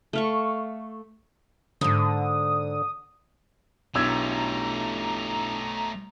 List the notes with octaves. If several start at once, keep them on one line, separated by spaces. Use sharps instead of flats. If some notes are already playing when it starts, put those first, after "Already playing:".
A3 F5 C#6
F2 G#2 D3 D#6
B1 A3 D4 E4 G4 A#5 E6 G#6